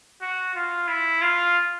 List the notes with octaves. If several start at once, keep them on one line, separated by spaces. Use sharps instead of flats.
F#4
F4
E4
F4